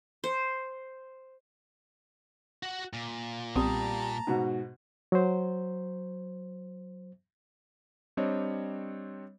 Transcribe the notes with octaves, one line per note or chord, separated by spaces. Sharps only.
C5
F#4 F#5
A#2
B1 G3 B3 C4 A5 A#5 D#6
G#2 B2 F#4
F#3 C5
G3 C4 D4 C#5 D#5